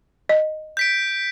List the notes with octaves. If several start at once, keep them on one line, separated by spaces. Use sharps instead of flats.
D#5
G6 B6 D7